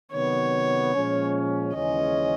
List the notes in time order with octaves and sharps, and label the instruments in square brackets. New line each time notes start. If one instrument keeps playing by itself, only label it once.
[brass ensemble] C3 D#3 F#3 B3 [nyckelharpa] C#5
[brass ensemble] A#2 F3 G#3 C#4
[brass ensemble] D#2 C#3 E3 G#3 C#4 [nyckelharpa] D#5